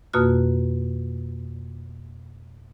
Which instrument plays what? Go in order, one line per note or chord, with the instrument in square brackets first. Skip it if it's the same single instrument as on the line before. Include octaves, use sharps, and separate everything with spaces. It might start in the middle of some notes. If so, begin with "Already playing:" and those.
[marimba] F2 B2 A#3 F#4 F6